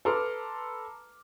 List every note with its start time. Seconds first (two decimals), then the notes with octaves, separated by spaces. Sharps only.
0.05 A4 B4 A#5 C6 D6 F6